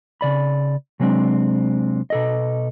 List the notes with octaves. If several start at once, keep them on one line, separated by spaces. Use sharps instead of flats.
C#3 D5 B5
C3 F#3 G#3 C4 D4
B2 A4 D#5